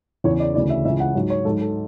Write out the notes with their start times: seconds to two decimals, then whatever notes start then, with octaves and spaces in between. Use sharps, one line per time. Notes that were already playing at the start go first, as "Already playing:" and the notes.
0.24 E2 C#3 E3 C#5
0.40 D5
0.55 D2 C#3 E3 D5
0.70 E5
0.85 C#2 C#3 E3 E5
1.00 F#5
1.15 G#2 F#3
1.30 C#5
1.45 G#2 F#3 A4
1.61 A4